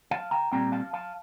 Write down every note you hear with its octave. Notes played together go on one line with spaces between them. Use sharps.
F5 A5
G5 A#5
A#2 G3 C4 G5 A#5
F5 A5
F5 A5